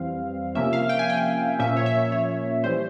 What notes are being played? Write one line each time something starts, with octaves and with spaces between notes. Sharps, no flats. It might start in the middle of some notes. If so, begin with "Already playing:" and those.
Already playing: F2 E3 G3 C4 F5
C3 F3 A#3 C#4 E5
F5
G5
G#5
G5
A#2 F3 A#3 C#4 E5
C#5
E5
C#5
E3 G3 C5